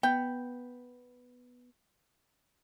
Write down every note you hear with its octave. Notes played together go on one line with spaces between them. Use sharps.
B3 G5